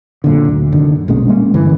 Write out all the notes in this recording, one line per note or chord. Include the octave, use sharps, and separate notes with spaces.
F#2 A#2 D3
D2
F1 F#2 D3 D#3
B1 A#2 G#3 C#4
G#3 A#3 C#4
G2 D3 E3